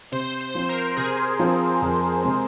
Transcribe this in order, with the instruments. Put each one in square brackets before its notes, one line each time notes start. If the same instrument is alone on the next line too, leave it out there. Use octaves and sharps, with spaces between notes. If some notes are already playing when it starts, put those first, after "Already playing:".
[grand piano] C3 [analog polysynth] C5
[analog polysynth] C5
[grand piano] F3 C4
[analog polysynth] A#4
[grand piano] C3 [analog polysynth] G#4
[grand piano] F3 C4
F2
C3 G#3 C4